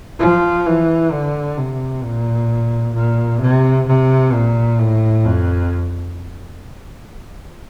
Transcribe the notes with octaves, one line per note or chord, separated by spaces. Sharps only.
F3
E3
D3
C3
A#2
A#2
C3
C3
A#2
A2
F2